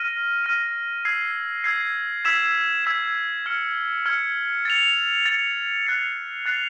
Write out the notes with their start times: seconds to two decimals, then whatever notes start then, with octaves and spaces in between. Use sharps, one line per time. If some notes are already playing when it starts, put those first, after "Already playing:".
Already playing: F6 A#6 D#7
0.44 F6 A#6 D#7
1.05 E6 G#6 C7
1.64 E6 G#6 C7
2.25 E6 G#6 B6 E7
2.85 E6 G#6 B6 E7
3.46 F6 G#6 C#7
4.06 F6 G#6 C#7
4.65 A6 C#7 F7
5.26 A6 C#7 F7
5.86 F#6 A6 C7 F7
6.46 F#6 A6 C7 F7